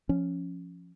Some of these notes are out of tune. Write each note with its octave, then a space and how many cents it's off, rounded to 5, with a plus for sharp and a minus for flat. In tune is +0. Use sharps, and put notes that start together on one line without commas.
F3 +0 C#4 +0